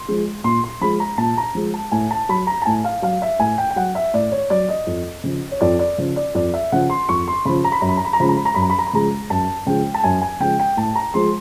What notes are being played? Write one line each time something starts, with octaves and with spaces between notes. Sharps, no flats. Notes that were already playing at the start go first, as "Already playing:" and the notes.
Already playing: C6
F3 G#3
A#2 C6
C6
F3 G#3 B5
A#5
A#2 A5
A#5
F3 G#3
A5
A2 G#5
A5
F#3 B5
A#5
A5
A2 G#5
F5
F#3 F5
E5
A2 G#5
G5
G5
F#3 F#5
E5
A2 D5
C#5
F#3 D5
D#5
F2
C#3 F3
C#5
F2 D5
D5
C#3 F3
D5
F2 D5
E5
C#3 F3 F#5
C6
F2 C#6
C6
C#3 F3 B5
A#5
B5
F#2 A#5
B5
A#5
B5
A#5
C#3 F3 G#3 B5
A#5
B5
A#5
F#2 B5
A#5
B5
A#5
B5
C#3 F3 G#3 A#5
F#2 A5
C#3 F3 G#3 G5
A5
F#2 G#5
G#5
C#3 F3 G#3 G5
G5
A2 A5
A#5
F3 G#3 C6